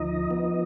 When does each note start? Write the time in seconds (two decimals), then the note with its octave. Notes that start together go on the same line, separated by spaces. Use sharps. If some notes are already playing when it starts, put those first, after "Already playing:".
Already playing: D2 F3 D#4 D#5
0.31 B3